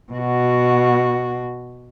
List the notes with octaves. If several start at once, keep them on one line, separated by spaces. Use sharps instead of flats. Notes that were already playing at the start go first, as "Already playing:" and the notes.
B2 F#4